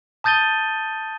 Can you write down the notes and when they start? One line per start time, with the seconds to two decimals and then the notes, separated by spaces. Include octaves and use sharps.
0.24 A5 D#6 G6 A6 D#7 G7